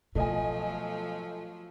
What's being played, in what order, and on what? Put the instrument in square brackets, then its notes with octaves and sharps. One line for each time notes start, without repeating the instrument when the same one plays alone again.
[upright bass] B2 [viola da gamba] F3 F#3 [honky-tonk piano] A3 D#5 G#5